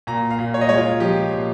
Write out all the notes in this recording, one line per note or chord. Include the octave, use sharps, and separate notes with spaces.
A#2 A#5
F5
A#2
C#5
D#5
G#3 C#5
F4
F3 G4
A#2